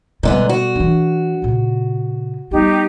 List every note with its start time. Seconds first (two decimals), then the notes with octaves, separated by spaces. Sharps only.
0.23 G#2 B2 D3 G3 B3
0.49 F#4
0.76 E3 D4
1.42 A#2 C#3
2.51 G3 B3 D#4 G4